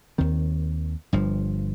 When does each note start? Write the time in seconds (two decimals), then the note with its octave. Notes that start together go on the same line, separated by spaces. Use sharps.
0.18 D#2 D#3 C4
1.13 G1 G2 F3